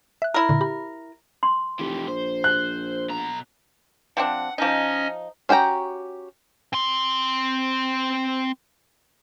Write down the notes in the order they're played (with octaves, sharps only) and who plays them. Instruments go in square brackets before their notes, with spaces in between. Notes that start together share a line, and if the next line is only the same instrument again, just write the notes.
[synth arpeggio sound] E5 F#6
[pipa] E4 A#4
[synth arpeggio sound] A#2 D3
G4 B5
[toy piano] C6
[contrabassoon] F1 [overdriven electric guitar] E3 G4
[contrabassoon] A#1 [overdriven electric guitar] C5
[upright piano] F#6
[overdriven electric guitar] B2 A#5
[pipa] F3 C4 D4 [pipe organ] F#5
[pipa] F3 D#4 [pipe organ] C#4 D#5 G#5
[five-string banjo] C#4 F#4 G4 G5 A#5
[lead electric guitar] C4 C6